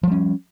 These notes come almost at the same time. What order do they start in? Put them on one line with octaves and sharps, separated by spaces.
F3 G3 C#4